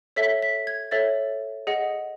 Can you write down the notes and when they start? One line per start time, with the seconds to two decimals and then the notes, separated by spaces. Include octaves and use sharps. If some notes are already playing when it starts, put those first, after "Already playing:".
0.16 A4 C#5 E5 B6
0.43 B6
0.67 G#6
0.91 A4 C#5 E5 A6
1.67 G#4 D#5 F#5